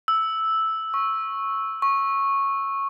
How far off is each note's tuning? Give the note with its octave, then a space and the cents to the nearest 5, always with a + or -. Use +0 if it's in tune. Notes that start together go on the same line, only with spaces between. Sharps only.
E6 -5
C#6 -10
C#6 -10